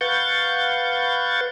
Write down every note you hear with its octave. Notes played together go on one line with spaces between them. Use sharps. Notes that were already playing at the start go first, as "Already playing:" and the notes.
B4 F5 F#5 C#6 G6 A6